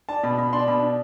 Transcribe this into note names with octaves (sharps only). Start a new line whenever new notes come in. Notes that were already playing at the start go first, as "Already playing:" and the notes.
D4 A5
B2 B5
B2 B5
D4 C6
B2 B5
D4